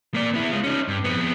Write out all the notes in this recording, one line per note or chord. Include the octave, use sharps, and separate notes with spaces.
A#3 D5
B3 E4
G#3 F4
C#4 D#4
G2
F2 B3